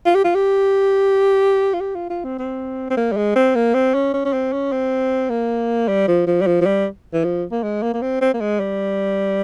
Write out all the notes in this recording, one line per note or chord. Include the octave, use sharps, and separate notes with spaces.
F4
G4
F4
G4
F4
G4
F4
F4
C4
C4
C4
A#3
G3
G#3
C4
A#3
C4
C#4
C#4
C#4
C4
C#4
C4
A#3
G3
F3
F3
G3
F3
F3
G3
E3
F3
A#3
G#3
A#3
A#3
C4
C4
A#3
G#3
G3